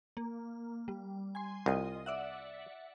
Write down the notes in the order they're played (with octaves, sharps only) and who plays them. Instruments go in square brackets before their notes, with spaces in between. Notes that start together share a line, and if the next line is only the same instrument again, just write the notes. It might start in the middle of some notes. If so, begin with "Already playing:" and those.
[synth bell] A#3
G3
G#5 C6
[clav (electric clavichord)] C2 [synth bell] F4 D#5
[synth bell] D5 E5 F#5